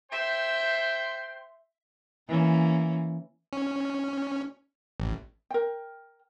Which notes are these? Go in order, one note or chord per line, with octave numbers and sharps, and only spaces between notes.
C5 E5 G5 C6
E3 A#3 C#4
C#4
A1
A#4 G5